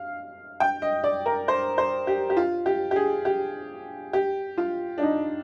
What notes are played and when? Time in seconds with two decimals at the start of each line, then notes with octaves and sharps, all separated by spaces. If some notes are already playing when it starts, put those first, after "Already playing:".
Already playing: F5
0.60 G5
0.82 D#5
1.04 D5
1.26 A#4
1.48 C5
1.78 C5
2.07 G4
2.30 G4
2.37 F4
2.66 G4
2.91 G4
2.96 G#4
3.25 G4
4.13 G4
4.58 F4
4.98 D4
5.02 D#4